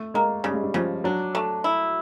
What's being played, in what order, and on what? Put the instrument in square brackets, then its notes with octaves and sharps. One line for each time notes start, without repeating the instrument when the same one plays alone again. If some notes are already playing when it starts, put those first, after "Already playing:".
Already playing: [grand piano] A3
[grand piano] G#3 [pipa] A#3
[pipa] C#3 [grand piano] G3
[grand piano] G#3
G3
[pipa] C#3 [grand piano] F3
[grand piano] F#3 [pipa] D4
[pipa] A3
E4